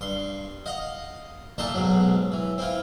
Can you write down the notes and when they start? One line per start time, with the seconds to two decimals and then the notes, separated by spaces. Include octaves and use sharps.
0.01 G2 C6
0.66 D#5 F5 F#5
1.58 A#2 A3 D#4 A5 A#5 C6
1.74 B1 G#2 F#3
2.32 E3
2.58 C4 E4 F4